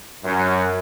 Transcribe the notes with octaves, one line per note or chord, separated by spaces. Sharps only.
F#2